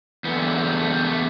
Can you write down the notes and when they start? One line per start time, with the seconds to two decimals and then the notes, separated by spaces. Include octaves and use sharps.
0.24 E2 D3 B3
0.39 G3
0.51 F#3
0.64 G3
0.77 A3
0.91 G3
1.04 A3